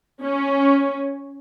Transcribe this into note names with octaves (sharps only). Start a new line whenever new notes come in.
C#4